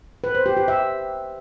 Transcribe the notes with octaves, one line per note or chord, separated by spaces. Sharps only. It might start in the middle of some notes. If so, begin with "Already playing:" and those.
B4
C5
G4
G4
E5